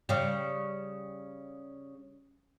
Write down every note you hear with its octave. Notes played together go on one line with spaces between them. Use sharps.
C#3 G3